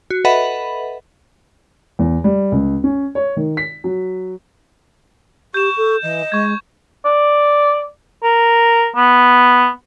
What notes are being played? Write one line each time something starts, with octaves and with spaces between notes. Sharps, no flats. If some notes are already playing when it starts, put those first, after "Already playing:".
F#4
A4 B4 D#5 E5 F#5 B5
E2
G3
C#2
C#4
C#5
D#3
B6
F#3
G4 C#6 G6 E7
A4
E3 D#5
G#3 C#6 G#6
D5
A#4
B3